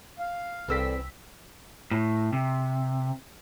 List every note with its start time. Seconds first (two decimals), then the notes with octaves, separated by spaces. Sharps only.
0.19 F5
0.68 C2 E3 C4 G#4 A4 D5 E6 B6
1.91 A2
2.33 C3